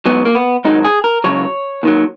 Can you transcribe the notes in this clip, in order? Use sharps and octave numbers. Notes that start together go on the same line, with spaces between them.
G#2 F#3 B3
A#3
B3
G#2 D#3 F#3 D#4
G#4
A#4
C#2 C#3 F#3 C#5
D#2 D#3 F#3